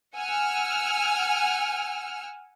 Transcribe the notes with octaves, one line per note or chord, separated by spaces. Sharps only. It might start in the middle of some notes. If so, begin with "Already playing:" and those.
F#5 G#5 E6 F6